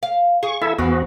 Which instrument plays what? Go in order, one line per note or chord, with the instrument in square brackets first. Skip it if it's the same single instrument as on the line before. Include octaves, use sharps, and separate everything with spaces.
[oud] F5
[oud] G#4 [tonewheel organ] C#6
[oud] E2 [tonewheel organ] E4 A4 E5
[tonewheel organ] E2 B3 F#4 [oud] E3 F3